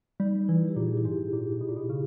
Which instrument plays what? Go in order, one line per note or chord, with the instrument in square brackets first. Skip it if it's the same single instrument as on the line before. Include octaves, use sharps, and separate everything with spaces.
[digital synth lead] G3 [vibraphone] D#4
[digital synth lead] E3 [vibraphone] E4
[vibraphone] G4
[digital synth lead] A#2 [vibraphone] G#4
[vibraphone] E4
[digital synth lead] G#2 [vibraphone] G4
[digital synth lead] A#2
B2
A#2
B2
C#3